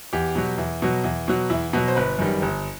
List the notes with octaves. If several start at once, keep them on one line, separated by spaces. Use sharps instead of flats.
E2 G4
B2 F#3
E2
B2 F#3
E2
B2 F#3
E2 E4
B2 F#3
C5
G1 B4
F#2 D#3 G3
G1